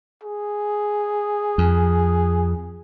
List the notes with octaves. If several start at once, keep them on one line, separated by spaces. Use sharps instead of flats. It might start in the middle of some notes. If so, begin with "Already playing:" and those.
G#4
F2